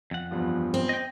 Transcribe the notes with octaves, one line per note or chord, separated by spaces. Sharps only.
F2 F#5
E2 G2 F3
C4
D#5 G5